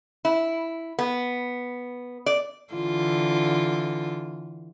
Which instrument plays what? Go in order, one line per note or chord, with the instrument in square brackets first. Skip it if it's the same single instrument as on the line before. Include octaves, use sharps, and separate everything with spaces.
[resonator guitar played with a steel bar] E4
B3
D5
[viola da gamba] D3 E3 F4